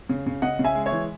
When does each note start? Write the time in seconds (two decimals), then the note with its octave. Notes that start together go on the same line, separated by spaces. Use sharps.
0.09 C#3
0.26 C#3
0.42 C#3 D#5 F#5
0.59 C#3
0.64 E5 G#5
0.75 G#3
0.86 C#5 E5
0.92 E3